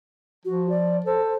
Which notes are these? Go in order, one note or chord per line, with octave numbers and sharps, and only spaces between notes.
F3 F#4
D5
A4 C5